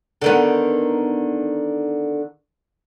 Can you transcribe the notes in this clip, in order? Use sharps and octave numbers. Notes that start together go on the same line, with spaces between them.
D3 D#3 B3